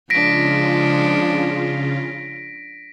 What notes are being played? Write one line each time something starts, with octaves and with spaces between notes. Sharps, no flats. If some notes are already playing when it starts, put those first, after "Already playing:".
C#3 F3 G#3 D4 F4 A#6 B6 D7